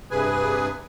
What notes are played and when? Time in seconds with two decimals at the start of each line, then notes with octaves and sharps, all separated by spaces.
0.11 G2 C3 G#4 B4 G#5